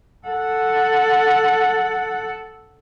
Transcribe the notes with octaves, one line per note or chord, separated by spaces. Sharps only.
A4 F#5